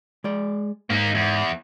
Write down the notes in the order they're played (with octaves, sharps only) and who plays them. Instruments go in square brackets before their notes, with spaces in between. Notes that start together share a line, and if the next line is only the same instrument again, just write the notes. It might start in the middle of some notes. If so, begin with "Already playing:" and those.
[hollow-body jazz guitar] G#3 D5
[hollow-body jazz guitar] G#2 [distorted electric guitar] A#3 D#4
[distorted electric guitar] E2